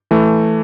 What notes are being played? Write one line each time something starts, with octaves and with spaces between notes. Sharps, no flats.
E3 A3